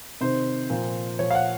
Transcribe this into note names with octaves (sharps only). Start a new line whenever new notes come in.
C3 D#3 C5
A#2 F3
A#2 F3 C#5
F5
F#5